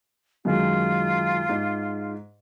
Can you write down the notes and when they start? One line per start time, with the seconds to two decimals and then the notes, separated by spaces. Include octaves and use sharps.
0.45 F#2 D#3 G#3 F4
1.49 G#2